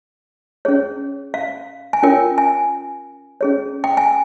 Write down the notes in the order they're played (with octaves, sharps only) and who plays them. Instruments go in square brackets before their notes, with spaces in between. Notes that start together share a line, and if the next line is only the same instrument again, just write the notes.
[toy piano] C#4 G#4 C#5
F5
G#5
C#4 F4 A#4 C#5 G5
G#5
C#4 G#4 C#5
G5
G#5